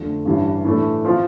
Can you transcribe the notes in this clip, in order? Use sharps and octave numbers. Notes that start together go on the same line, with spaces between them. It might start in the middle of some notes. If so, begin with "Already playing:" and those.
Already playing: F2 D3 A3
A1 G2 E3
A2 E3 A3 D4
F3 C4 F4